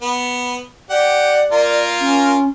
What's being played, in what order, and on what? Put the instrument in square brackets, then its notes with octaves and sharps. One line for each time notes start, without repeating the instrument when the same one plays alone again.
[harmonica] B3
[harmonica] G4 F#5 [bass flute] D5
[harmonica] A#3 F4 A#4
[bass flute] C#4